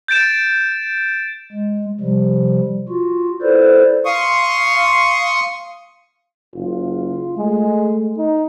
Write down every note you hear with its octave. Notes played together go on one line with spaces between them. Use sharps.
G6 A6 D7 E7
G#3
C3 F3 G3
F4 F#4
E4 A4 B4 C5 D5
F5 C6 C#6 D#6
F#1 F4
G#3 A3
D#4